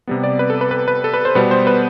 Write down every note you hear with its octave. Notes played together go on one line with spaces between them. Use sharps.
C3 G3 B3
D5
B4
A4
B4
B4
B4
A4
B4
C5
B2 G3 B3 B4
C5
B4